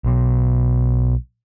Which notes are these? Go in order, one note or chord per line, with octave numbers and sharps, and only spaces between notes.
B1 B2